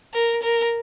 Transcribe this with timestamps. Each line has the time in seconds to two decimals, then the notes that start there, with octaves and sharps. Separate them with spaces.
0.14 A#4
0.43 A#4